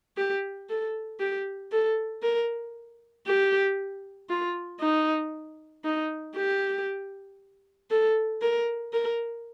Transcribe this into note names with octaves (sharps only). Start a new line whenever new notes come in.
G4
A4
G4
A4
A#4
G4
F4
D#4
D#4
G4
A4
A#4
A#4